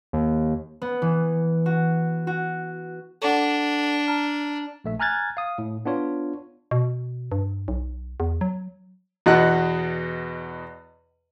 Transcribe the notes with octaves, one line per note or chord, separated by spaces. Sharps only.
D#2
B3
E3
F#4
F#4
D4 A4 F#5
A5 A#5 F6
A#1 A3 E5
G#5 A#5 F6 F#6 G#6 A6
F5 D#6
A2
B3 D4 F4 C#5
B2
G2
B1
E2
F#3
E2 B2 D#5 F#5 F#6